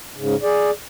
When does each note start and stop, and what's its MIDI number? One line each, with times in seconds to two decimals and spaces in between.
0.16 0.36 44
0.16 0.36 49
0.43 0.71 68
0.43 0.71 74